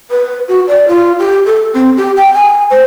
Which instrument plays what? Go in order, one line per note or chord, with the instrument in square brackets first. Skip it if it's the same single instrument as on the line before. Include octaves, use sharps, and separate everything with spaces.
[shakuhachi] B4
F#4
D5
F4
G4
A4
C4
G4
G5
G#5
C5